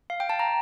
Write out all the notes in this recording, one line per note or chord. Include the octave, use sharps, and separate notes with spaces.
F5
G5
A5
A#5